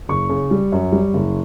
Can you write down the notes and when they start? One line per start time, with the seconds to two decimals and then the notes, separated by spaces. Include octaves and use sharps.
0.09 F#1 C#6
0.29 C#3
0.51 G3
0.72 F#2
0.92 G3
1.14 F#1